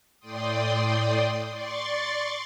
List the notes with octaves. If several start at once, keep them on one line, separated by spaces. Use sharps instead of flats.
A2 D5 G5 C6 D#6
D5 C6 C#6 A6